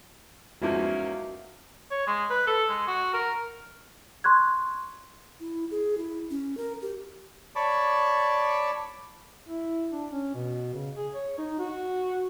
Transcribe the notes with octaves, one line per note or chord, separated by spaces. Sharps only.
E2 G#2 F3 G#3 A#3 C#4 F#4 E5
C#5
G#3
B4
A4
G#3
F#4
A#4
C6 C#6 F#6 G#6
E4
G#4
E4
C#4
A#4
G4
C#5 D5 A5 B5 C#6 D6
E4
D4
C#4
B2
C#3
G#4
C#5
D#4
F#4